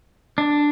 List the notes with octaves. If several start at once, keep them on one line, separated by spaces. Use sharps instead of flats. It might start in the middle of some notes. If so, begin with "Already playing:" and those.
D4